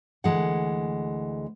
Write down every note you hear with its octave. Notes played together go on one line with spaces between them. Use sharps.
D2 E3 G#3 F#5